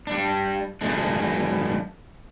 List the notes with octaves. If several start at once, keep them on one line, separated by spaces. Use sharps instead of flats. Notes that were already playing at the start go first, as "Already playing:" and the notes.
G3 D4
F#2 D#3 G#3 D4